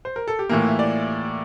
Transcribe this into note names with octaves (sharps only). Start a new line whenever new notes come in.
C5
A#4
A4
G4
A2 E3 A#3 F4
E5
D5